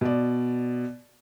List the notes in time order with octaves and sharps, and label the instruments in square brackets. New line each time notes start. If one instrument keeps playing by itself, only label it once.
[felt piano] B2 D5